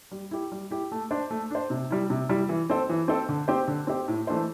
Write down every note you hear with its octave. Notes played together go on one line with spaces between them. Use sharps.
G3
E4 G4
G3
E4 G4
A3
D4 C5
A3
D4 C5
C3
G3 E4
C3
G3 E4
E3
C4 A4 C5
E3
C4 A4 C5
D3
C4 G4 C5
D3
C4 G4 C5
A2
E3 A3 D4 C5